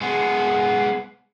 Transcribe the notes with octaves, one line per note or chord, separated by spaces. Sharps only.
G#3 B3